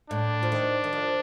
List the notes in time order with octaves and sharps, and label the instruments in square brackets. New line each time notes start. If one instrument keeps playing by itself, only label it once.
[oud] A2 [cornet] D4
[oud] F3
D#3
D#3
F3